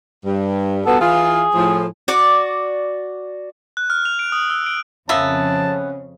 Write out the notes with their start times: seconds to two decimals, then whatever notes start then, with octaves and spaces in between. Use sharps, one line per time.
0.25 G2
0.86 G2 B2 B3 A4
1.01 E3 F4 G#4
1.54 A2 F3
2.08 F#4 D5
3.77 F#6
3.90 F6
4.05 F7
4.19 D7
4.32 D#6
4.50 E6
4.66 D7
5.09 F2 C#3 A#3 B3 C#4 E5 A5